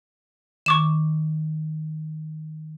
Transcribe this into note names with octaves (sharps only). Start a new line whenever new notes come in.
D#3 C#6 D6 E7